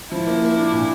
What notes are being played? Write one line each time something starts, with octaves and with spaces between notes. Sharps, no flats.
F3 E4
A#3
A#3
D4
A#2